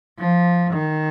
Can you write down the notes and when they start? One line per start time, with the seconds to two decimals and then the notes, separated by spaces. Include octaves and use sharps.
0.19 F3
0.74 D#3